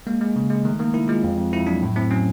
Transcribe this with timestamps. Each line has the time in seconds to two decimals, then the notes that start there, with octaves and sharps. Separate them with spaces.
0.07 G#3 A#3
0.21 G#3
0.36 C#3
0.50 G#3
0.65 D#3 A3
0.79 D#3 A#3
0.94 D#3 E4
1.08 G#3 F4
1.24 F2
1.38 F2
1.52 F2 E4
1.67 F#3 D4
1.82 A2
1.96 A2 C4
2.11 F#3 C#4